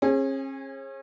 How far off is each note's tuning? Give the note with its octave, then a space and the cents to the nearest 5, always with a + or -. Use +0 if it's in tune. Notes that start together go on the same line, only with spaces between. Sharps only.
C#4 -40 G#4 -10